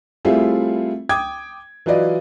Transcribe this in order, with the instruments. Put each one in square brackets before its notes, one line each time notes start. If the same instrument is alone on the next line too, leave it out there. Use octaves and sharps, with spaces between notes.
[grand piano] G3 A3 C4 E4 F4 G#4
G5 D6 D#6 G#6
E3 F#3 F4 B4 D5 D#5